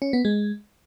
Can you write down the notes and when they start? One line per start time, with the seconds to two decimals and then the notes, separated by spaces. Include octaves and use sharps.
0.02 C#4
0.13 B3
0.25 G#3